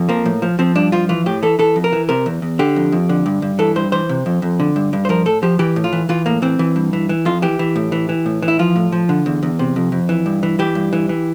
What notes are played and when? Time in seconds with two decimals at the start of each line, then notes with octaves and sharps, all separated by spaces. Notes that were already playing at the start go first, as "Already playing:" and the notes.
Already playing: F2
0.09 F3 A#3
0.26 A2
0.42 F3
0.59 F3 C4
0.75 G2 D4
0.92 F3 F4
1.09 E3 F4
1.26 A2 G4
1.43 E3 A4
1.59 E3 A4
1.76 F2
1.84 A#4
1.93 E3
2.09 C3 A#4
2.26 E2
2.42 E2
2.59 D3 G4
2.76 F2
2.92 F2
3.09 D3
3.26 G2
3.42 G2
3.59 E3 A4
3.76 G2 C5
3.92 E3 C5
4.09 C3
4.26 F2
4.42 F2
4.60 D3
4.76 G2
4.93 G2
5.05 C5
5.09 F3 A#4
5.26 A2 A4
5.43 F3 G4
5.59 E3 G4
5.76 A2
5.84 F4
5.93 E3
6.09 E3 F4
6.26 A2 A#3
6.42 E3 C4
6.59 E3
6.76 G2
6.93 E3
7.09 E3
7.25 F2 F4
7.42 E3 G4
7.59 E3
7.76 A2
7.92 E3
8.09 E3
8.26 A2
8.42 E3
8.48 E4
8.59 F3 F4
8.76 A2
8.92 F3
9.09 D3
9.26 E2
9.43 E2
9.59 C3
9.76 F2
9.92 F2
10.09 E3
10.26 G2
10.43 E3
10.59 E3 G4
10.75 G2
10.93 E3
11.09 E3